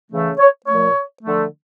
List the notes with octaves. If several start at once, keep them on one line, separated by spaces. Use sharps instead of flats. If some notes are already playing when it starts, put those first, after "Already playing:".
C#3 E3 A3
C#5
A#2 F3 A3 C#5
D3 F3 A3